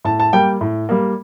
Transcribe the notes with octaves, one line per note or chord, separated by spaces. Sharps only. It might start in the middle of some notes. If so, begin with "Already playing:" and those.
A2 A5
A5
G3 A#3 G5
A2
G3 A#3